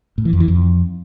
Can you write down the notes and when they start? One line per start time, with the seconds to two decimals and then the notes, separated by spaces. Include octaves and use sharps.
0.18 A2
0.25 E3
0.33 F2
0.40 E3
0.48 F2